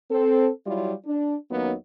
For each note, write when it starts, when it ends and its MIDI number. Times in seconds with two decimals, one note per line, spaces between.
0.10 0.49 60
0.10 0.49 69
0.66 0.93 54
0.66 0.93 55
0.66 0.93 64
0.66 0.93 65
1.06 1.35 62
1.51 1.73 39
1.51 1.73 54
1.51 1.73 58
1.51 1.73 59
1.51 1.73 61
1.51 1.73 63